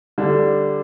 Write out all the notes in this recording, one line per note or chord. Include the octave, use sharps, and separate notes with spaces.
D3 G3 D4